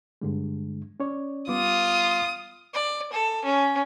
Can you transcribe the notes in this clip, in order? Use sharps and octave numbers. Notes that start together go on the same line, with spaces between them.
G2 D3 G#3
C#4 C#5 D5
G3 B3 F4 D6 D#6
D5
A4
C#4